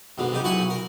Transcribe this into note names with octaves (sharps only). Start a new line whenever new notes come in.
G#2 B2 D3
C2 C#3 D#4 G4
B1 E4 F#4 F#5 G#5 D#6
A#4